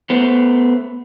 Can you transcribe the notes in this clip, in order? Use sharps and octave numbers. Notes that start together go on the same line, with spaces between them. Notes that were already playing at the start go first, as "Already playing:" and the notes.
A3 B3 C5